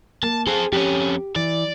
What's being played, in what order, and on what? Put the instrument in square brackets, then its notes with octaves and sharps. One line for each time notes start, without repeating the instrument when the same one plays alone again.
[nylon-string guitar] A#3 [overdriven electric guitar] A5
[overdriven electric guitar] C4 A4 [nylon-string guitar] G#4
[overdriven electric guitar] F2 C#4 [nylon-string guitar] G4
[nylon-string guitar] E3 [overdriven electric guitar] D5